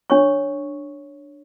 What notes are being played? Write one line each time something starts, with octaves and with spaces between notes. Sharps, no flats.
D4 C#5 C#6